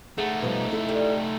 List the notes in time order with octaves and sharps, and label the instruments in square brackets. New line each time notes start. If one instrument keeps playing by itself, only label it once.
[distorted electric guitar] A3 D#4 [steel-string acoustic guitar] G#4 D#5 F#5
[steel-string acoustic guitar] B2 F3 G3
E4 A4 E5
[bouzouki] G3